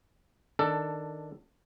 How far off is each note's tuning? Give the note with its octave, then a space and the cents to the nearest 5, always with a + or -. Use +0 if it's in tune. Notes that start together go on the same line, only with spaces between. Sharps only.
D#3 +0 D4 +0 A4 +15